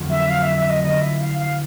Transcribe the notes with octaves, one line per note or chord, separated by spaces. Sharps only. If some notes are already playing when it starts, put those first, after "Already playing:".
Already playing: F2 D3 F#3 A3 C4
E5
F5
E5
E5
D#5
D3 F#3 B3 E4 D#5
E5
F5
F5